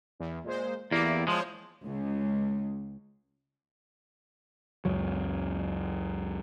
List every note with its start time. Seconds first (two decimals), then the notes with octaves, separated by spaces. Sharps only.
0.20 E2
0.44 A#2 G#3 C5
0.91 E2 A#3 E4 G4 D5
1.27 F3 G#3 C5 C#5
1.84 C#2
4.85 C#2 F#2 F#3